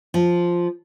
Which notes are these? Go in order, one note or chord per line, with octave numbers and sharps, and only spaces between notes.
F3